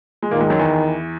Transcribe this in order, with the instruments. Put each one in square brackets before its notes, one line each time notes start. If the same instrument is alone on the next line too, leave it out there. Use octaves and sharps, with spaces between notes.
[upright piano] G#3
[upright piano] A#2 A#3 [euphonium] D#3
[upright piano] G#2 G#3
F#2 F#3
E2 E3